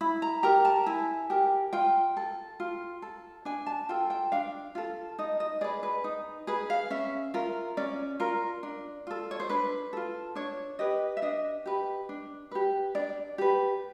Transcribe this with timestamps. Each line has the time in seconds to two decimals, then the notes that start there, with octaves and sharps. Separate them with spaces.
0.01 E4 B5
0.22 A#5
0.43 G4 A#4 A#5
0.65 A5
0.86 E4 G#5
1.30 G4 A#4
1.73 F4 G5
2.17 A4
2.60 F4
3.02 A4
3.45 D4 G#5
3.66 A5
3.89 F4 A4 G5
4.10 G5
4.32 D4 F5
4.75 F4 A4
5.18 D#4 D#5
5.40 D#5
5.61 G#4 B4 D5
5.83 B4
6.04 D#4
6.47 G#4 B4
6.70 F5
6.90 C#4 E5
7.34 F4 A#4
7.77 C#4 D5
8.20 F4 A#4
8.63 D4
9.07 F4 A4
9.31 C#5
9.40 C5
9.49 D4 B4
9.93 F4 A4
10.35 D4 C#5
10.79 G4 B4 D#5
11.17 E5
11.22 D4 D#5
11.66 G4 B4
12.09 D4
12.51 G4 B4
12.95 D4 D5
13.38 G4 B4